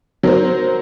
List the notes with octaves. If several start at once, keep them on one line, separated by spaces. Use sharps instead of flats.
F#3 A#4 C5